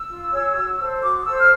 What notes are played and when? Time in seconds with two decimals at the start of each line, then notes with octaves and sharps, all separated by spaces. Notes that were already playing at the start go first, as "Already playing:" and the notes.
Already playing: E6
0.09 F4
0.31 G#4 C#5
0.55 F#4
0.79 A4 C5
1.02 F#4 D6
1.21 D#6
1.25 A4 C5 E6
1.38 F6